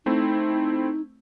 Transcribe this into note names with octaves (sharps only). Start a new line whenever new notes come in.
A3 C4 D#4 E4